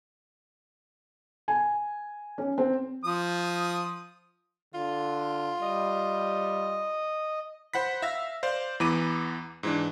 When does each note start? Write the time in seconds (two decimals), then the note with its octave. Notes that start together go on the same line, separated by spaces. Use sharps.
1.48 G#5
2.38 C#4
2.58 C4
3.04 F3 D#6
4.74 D3 F4
5.62 G3 D#5
7.74 C5 F#5 B5 B6
8.02 E5 F5 E6 A#6
8.43 C5 D5 F5
8.80 E2 E3 B3 B5 D6 D#7
9.63 G#2 E3 D4